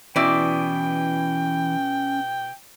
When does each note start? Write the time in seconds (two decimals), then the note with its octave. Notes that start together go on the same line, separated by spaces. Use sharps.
0.16 B2 E3 C#4 E4 D5 G5 D6